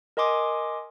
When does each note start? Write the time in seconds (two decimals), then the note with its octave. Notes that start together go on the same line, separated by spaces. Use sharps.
0.17 A#4 D#5 G#5 C6 D6 D#6